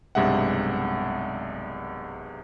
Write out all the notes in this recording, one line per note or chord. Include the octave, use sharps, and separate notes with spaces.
B1 G2 C3 G#3 E5 F#5